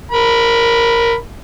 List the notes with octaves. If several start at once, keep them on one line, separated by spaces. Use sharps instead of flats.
A#4 B5